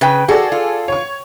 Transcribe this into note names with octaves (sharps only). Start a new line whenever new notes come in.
C#3 B4 G5
F#4 G#4 A4 D5
F4
C#5 C#6